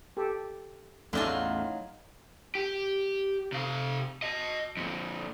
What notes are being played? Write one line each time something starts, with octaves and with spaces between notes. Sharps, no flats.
G4 A4
A1 E2 F#3 A3 D#4 F4 D5 G#5
G4
C3 F5
D#5 A5
F2 A#2